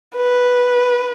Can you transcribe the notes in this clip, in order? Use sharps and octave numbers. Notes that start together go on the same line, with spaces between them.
B4